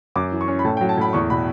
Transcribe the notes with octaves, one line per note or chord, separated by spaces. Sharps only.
F#2 D6
E3
C#6
C#4
B5
A2 A5
G5
F#3
A5
A2 B5
E2 C#6
B2 B5